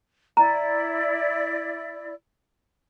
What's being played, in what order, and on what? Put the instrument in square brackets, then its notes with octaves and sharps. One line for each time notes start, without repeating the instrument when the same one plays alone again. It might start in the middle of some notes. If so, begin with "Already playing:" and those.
[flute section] E4 D5 [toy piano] A#5